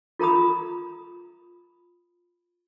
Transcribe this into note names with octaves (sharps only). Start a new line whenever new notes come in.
F4 A#4 A#5 B5 D#6